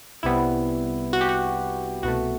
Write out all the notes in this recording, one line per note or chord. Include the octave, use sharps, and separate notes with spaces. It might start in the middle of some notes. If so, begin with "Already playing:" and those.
C2 C3 G3 B3 E4
F#4
G4
F#4
C2 B2 A3 F#4